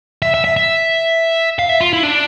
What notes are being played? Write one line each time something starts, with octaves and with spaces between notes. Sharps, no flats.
E5
E5
E5
E5
F5
E5
F4
E4
D4